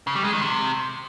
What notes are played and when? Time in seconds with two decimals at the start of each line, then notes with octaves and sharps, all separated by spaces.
0.07 C#3
0.15 G3
0.24 G#3
0.33 D#3
0.41 C3